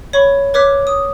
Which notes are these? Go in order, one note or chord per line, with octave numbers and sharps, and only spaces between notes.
C#5 B5 C#6
B4 C#5 D6 F6 B6
D#6